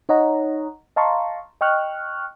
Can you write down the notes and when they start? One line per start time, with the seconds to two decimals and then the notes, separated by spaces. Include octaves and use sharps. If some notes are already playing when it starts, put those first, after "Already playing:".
0.09 D#4 C#5 D#5 F#5 A#5
0.96 D#5 F5 A5 A#5 C6 C#6
1.61 D#5 G5 C#6 F6 F#6